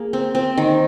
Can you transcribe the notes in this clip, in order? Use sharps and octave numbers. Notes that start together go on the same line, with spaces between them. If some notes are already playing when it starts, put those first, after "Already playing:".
Already playing: A#3 G#4
C4
C4
D#3